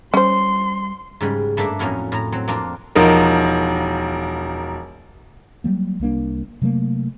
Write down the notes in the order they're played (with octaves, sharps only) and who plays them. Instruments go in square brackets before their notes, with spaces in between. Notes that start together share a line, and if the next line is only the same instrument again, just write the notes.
[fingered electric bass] G3 [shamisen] C#4 C5 [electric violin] C6
[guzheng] G#2 C#3 G3 G#3
G2 A3 A#3 D4 E5
F2 A2 F#3 A#3 C#4
A2 A#5
F#3 C4
F2 A#3 C4 D4 F4
[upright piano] E1 F3 D#4 A#4
[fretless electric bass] F#3 G3 A#3
C2 G3 A#3 D4
C3 F#3 A3 A#3